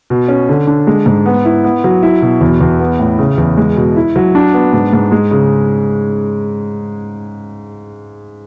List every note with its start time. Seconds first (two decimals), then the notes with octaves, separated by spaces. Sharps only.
0.10 B2
0.28 C#4
0.49 D3
0.67 D4
0.87 G#3
1.06 G#2
1.26 B3
1.45 E4
1.64 B3
1.84 F#3
2.03 E4
2.22 B2
2.41 E2
2.61 E2
2.80 B3
2.99 A2
3.19 C#3
3.38 E2
3.58 G#3
3.76 B2
3.96 E4
4.16 F#3
4.35 D4
4.54 B3
4.73 G#2
4.93 G#2
5.12 G#3
5.31 C#3